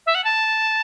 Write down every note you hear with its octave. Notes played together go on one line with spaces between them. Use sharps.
E5
F#5
A5